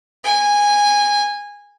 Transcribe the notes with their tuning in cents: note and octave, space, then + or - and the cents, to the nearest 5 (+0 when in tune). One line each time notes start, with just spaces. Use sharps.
G#5 -15